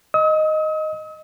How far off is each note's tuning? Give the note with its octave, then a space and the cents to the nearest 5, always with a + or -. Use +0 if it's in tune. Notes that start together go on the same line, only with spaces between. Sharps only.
D#5 +0 D#6 +45